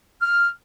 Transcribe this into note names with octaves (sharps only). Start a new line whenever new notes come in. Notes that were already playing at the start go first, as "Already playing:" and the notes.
F6